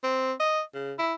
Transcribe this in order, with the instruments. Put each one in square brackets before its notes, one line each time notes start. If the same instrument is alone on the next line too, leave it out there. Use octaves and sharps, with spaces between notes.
[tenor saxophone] C4
D#5
C#3
E4